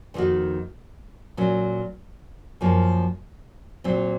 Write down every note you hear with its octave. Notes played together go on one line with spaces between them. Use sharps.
F2 D#3 A#3 D#4 F#4
A#2 F#3 C#4
F#2 F3 A#3
A#2 F#3 C4